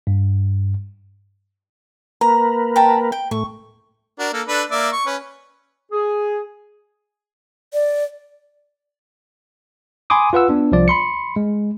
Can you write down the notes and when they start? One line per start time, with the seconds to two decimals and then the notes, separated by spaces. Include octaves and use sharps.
0.07 G2
2.21 A#3 A#4 B4 A#5
2.76 G5 A5 A#5
3.12 G5
3.31 A2 A3 C#6
4.19 D4 F#4 A#4
4.33 A#3 A4
4.48 D4 A4 B4
4.71 A#3 D5 E5
4.92 C#6
5.06 C#4 B4
5.92 G#4
7.73 D5
10.10 G#5 B5 C6 D6 D#6
10.33 F4 B4 F#5 E6
10.49 B3 D4
10.72 C2 F3 D5
10.88 B5 C6 C#7
11.36 G#3